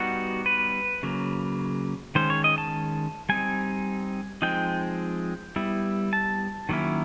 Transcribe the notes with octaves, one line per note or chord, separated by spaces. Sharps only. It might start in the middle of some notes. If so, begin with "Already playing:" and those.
Already playing: G3 B3 D#4 F#4
B4
C#3 F#3 A#3
D#3 G#3 C#4 C5
C#5
D#5
A5
G3 C4 D#4 G#5
F3 G#3 C4 D#4 G5
G3 B3 E4
A5
D#3 F#3 A#3 C#4 E4